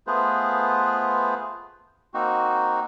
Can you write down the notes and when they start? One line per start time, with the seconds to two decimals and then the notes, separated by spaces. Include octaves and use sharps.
0.07 A3 B3 F4 G#4 B4 C5
2.14 A#3 C4 D#4 F#4